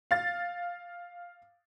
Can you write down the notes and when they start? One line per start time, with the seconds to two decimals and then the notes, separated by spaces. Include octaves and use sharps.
0.11 F5 A6